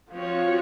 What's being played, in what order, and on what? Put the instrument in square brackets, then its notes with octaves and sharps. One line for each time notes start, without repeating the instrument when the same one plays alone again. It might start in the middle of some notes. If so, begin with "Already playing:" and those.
[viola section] F3 C4 F#4 C#5 [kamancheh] F4